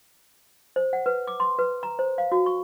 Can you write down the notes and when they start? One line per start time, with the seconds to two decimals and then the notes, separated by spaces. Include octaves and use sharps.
0.76 C5
0.93 F#5
1.06 B4
1.27 D6
1.40 C6
1.59 B4
1.83 A#5
1.99 C5
2.18 F5
2.32 F#4
2.46 C#6